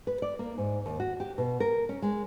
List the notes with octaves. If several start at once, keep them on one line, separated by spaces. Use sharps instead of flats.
B4
D5
A#3
G#2
D#2
F#4
G4
B2
A#4
C#4
G#3